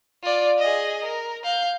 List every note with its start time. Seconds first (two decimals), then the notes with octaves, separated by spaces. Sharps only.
0.23 F4 D5
0.59 G#4 D#5
1.04 A#4
1.44 F5 G6